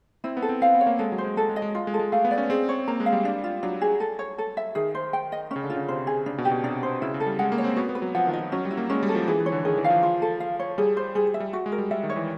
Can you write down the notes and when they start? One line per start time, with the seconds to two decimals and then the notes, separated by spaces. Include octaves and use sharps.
0.24 C4 E4
0.37 B3
0.42 A4
0.49 C4
0.62 C4 F5
0.74 B3
0.81 C#5
0.86 A#3
0.99 G#3 A4
1.12 F#3
1.18 C5
1.24 G#3
1.37 G#3 A4
1.49 G#3
1.56 D#5
1.62 G#3
1.75 F4
1.87 G#3
1.94 A4
1.99 G#3
2.12 A3 F5
2.25 B3
2.31 D5
2.38 C#4
2.50 C4 G#4
2.69 C#5
2.88 A#3 A#5
3.00 G#3
3.06 F5
3.13 G3
3.25 D4
3.44 F4
3.63 F#3 D4
3.81 G#4
4.00 A4
4.19 C#5
4.38 A4
4.57 E5
4.75 D#3 G#4
4.95 C5
5.13 G5
5.32 D#5
5.51 C#4
5.56 C#3
5.64 D3
5.70 F4
5.76 C#3
5.88 C3 C5
6.07 G#4
6.26 C#3 D4
6.38 B2
6.45 G4
6.51 B2
6.64 C3 D4
6.83 C5
7.02 C#3 E4
7.14 C#3
7.20 A4
7.26 G3
7.39 G#3 F#5
7.52 A#3
7.58 C#5
7.64 C4
7.76 B3 F#4
7.89 B3
7.95 B4
8.02 F#3
8.15 F3 F#5
8.27 D#3
8.33 D#5
8.39 F3
8.52 F#3 C#4
8.65 G3
8.71 E4
8.77 A#3
8.90 G#3 C#4
9.03 G3
9.09 A4
9.15 F3
9.28 E3 G#4
9.40 E3
9.46 C#5
9.52 D3
9.65 D#3 G#4
9.78 E3
9.84 F5
9.90 F3
10.03 F4
10.22 A4
10.40 F5
10.59 C#5
10.78 G3 G#4
10.97 C5
11.15 G3 G#4
11.28 G3
11.34 E5
11.40 G3
11.53 F#4
11.66 G#3
11.72 A#4
11.78 G3
11.91 G3 E5
12.03 D#3
12.10 C#5
12.16 E3